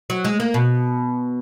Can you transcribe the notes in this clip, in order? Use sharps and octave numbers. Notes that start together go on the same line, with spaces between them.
F#3
G#3
A#3
B2